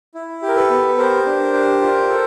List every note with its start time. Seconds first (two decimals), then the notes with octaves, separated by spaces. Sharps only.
0.15 E4
0.42 G4
0.48 A#4
0.56 A4 B4
0.70 B3
0.98 G4 A#4 C5
1.26 D4
1.54 G4
1.82 F4
2.09 A4